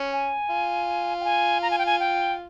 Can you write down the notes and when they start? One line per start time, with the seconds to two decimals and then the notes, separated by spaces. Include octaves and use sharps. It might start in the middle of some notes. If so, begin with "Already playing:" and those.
Already playing: C#4
0.13 G#5
0.50 F4
1.21 G5
1.24 G#5
1.62 A#5
1.71 G#5
1.79 G5
1.86 G#5
2.00 G5